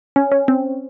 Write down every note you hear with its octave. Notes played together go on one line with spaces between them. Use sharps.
C#4
C#4
C4